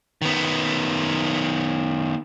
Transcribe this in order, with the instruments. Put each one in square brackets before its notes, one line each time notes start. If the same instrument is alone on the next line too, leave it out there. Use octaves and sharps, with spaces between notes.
[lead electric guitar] D#3 B3